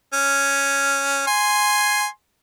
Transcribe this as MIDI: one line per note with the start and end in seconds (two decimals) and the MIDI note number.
0.13 1.26 61
1.27 2.07 80
1.27 2.07 84